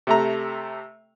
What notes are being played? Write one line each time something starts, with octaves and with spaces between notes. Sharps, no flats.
C3 A3 A#5